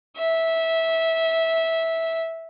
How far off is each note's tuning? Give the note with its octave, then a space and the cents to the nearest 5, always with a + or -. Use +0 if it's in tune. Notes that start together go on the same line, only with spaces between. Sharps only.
E5 -15